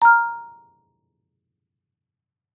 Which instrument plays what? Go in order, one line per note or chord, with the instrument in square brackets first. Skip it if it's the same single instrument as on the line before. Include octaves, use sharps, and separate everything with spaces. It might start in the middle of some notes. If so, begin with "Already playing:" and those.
[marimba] A#5 F6